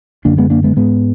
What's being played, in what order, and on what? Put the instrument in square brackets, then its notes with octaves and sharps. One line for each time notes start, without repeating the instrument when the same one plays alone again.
[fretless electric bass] F#2 D3 A#3 D4
G#3 B3
A#3 D4
G#3 B3
G#2 G#3 B3